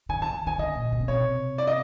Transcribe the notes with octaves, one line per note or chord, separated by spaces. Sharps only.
D3 G#5
D#3 A5
D#3 G#5
D3 D#5
A#2
B2
C#3
C3 C#5
D5
D#5